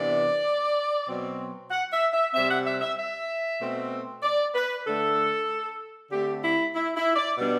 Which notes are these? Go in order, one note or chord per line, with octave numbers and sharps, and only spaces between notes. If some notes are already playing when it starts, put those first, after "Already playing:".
Already playing: C3 E3 B3 D4 D5
B2 F#3 C4
F#5
E5
E5
C3 G3 C4 E5
F#5
E5
E5
E5
B2 A3 C4
D5
B4
D3 A3 D4 A4
D3 A3 C4 G4
E4
E4
E4
D5
B2 G3 B3 D4